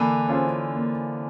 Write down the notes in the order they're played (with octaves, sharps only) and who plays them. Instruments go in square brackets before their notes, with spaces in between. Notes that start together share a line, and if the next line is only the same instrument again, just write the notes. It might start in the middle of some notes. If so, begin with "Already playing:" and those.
Already playing: [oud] D3 E3 [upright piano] A#3
[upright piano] C#4 F4 G#4 C5
A#3